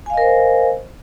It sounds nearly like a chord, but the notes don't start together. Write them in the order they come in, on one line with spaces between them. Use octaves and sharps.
G#5 F5 D#5 A#4 C5